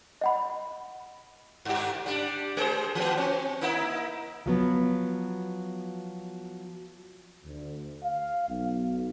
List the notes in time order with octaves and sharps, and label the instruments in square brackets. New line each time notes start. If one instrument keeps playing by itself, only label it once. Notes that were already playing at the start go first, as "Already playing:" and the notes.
[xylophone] D#5 F#5 B5
[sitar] G2 G4
G3 D4
G#3 G#4 C5
E3 B3
C4
A#3 D#4 E4
[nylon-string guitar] F3 F#3 B3
[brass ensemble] D2
F5
B1